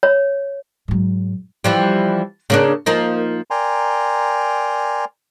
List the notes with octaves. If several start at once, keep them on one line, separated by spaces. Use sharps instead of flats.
C#5
G#2 F#3
E3 F3 G3
C#3 A#3 D4
F3 A#3 D#4
A#4 D5 G5 G#5 A#5 C6